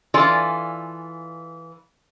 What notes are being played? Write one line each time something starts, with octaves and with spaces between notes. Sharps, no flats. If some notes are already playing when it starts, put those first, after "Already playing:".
E3 F4 A4 D5 G#5